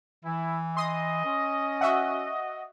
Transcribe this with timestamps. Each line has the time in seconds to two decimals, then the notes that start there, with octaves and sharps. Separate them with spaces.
0.25 E3 E4
0.77 D#5 C6 D#6
1.25 C#4
1.81 F#4 E5 F#5